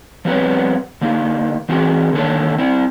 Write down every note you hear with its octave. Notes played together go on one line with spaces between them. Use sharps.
F3 G3 B3 C4 B4 C#5
D3 A#3 D#4
E3 C4 F#4 G#4
D3 D#3 A#3 A4 C#5 A5
C4 E4